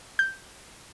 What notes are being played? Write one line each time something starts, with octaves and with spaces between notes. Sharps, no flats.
G6